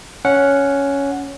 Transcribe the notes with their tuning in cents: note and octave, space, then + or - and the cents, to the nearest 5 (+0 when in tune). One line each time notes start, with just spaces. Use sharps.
C#4 +5 F#5 -5